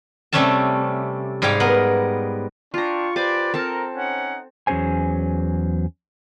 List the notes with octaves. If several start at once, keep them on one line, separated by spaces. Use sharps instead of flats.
C3 G3 A3 C#4 A4 A5
G#2 G3 G#4 F5 G5
B3 A#4
D4 F4 G5 A#5 C#6
G4 B4 C5 D5 G#5 D6
C4 A4 A#4 A5
C#4 D#4 F#5
E2 F#3 C#4 G#4 C5 G#5